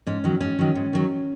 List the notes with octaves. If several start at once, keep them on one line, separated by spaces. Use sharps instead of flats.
G#2 C#4
D#3 F#3
G#2 C#4
D#3 F#3
G#2
D#3 F#3